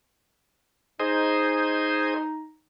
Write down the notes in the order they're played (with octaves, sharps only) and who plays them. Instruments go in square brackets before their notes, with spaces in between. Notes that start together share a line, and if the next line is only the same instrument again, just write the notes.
[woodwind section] D#4 [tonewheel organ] G#4 C5 D#5